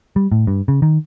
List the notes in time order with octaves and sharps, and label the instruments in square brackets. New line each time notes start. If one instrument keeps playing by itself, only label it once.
[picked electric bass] G3
A2
G2
C#3
D#3